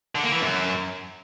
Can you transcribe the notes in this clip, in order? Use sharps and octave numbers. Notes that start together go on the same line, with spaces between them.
D3
A#3
E3
F#2